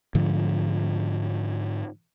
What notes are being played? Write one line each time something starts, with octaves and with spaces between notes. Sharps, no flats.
G#2 D3 F3